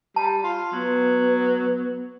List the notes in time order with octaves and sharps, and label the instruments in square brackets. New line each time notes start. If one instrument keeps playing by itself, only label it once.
[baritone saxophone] G3 [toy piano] A5
[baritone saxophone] F4
[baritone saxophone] F#3 [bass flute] B3